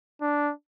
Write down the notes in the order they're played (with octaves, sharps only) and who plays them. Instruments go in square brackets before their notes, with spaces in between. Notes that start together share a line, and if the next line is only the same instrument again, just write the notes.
[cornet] D4